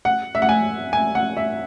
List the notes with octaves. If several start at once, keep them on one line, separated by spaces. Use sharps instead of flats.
F#5
E5
F#5
G#5
G#5
F#5
E5